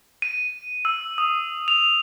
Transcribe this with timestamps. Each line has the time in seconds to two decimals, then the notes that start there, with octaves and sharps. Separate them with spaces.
0.22 D#7
0.85 E6
1.18 D#6
1.68 F7